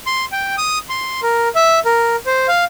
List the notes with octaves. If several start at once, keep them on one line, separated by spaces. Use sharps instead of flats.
C6
G5
D#6
C6
A#4
E5
A#4
C5
F5